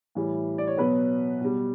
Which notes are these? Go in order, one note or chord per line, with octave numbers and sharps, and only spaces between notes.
A2 E3 G3
D5
C#5
B2 F#3 B3 B4
B2 G3